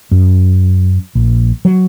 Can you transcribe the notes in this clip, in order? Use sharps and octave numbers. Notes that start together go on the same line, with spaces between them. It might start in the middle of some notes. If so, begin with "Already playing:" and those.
F#2
A#1
F#3